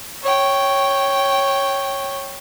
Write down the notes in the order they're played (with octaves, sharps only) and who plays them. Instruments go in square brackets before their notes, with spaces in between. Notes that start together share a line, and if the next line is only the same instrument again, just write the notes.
[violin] C#5 G5